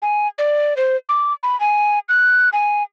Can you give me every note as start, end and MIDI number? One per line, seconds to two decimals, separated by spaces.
0.02 0.27 80
0.38 0.74 74
0.77 0.96 72
1.09 1.33 86
1.43 1.58 83
1.60 1.99 80
2.09 2.49 90
2.53 2.83 80